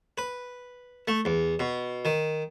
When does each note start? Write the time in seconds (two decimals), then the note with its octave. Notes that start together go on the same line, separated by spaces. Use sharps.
0.18 B4
1.08 A3
1.25 E2
1.59 B2
2.05 D#3